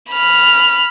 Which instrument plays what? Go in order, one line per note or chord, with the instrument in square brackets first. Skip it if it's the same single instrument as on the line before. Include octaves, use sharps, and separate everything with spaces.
[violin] B5 F6